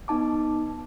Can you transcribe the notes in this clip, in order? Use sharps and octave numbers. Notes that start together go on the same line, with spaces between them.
B3 D#4 A5 D6